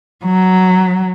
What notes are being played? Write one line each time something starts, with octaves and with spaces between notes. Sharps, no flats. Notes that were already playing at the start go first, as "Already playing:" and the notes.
F#3